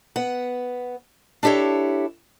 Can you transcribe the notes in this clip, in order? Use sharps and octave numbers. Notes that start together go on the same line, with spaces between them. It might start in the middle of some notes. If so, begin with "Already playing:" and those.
B3 F#5
D4 E4 G4 A4 C#5